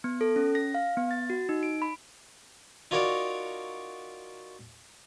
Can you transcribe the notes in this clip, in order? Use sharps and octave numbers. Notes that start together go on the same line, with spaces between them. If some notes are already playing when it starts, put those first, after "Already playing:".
B3
A4
C#4
A#6
F5
B3
A6
F#4
D#4
D7
B5
D#4 F4 F#4 A#4 C#5 D5